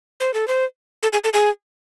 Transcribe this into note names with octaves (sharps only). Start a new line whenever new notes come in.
C5
A4
C5
A4
G#4
A4
G#4